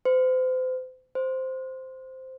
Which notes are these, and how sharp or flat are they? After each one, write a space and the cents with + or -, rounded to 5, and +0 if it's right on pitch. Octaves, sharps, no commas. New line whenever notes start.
C5 -35
C5 -5